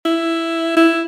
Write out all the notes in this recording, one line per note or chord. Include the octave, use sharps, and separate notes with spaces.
E4
E4